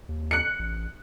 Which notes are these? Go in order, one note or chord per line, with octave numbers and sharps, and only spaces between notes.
D#2
F#6 C#7
A1